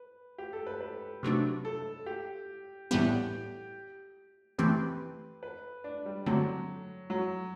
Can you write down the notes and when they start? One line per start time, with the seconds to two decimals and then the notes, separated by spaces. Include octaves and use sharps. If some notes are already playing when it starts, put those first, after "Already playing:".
Already playing: B4
0.38 G4
0.53 A4
0.67 B4
0.81 B4
1.23 C3 F#3 A3 D4
1.65 A4
2.06 G4
2.91 A2 E3 G3 B3 G4
4.58 E3 A3 C4 G4 B4
5.43 B4
5.84 D4
6.06 G3
6.26 D3 F#3 A3 C4
7.10 F#3